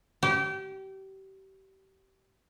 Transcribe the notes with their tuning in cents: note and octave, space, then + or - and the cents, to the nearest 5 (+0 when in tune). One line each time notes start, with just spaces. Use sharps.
G4 -30